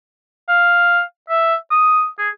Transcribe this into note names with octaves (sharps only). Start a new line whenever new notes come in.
F5
E5
D#6
G#4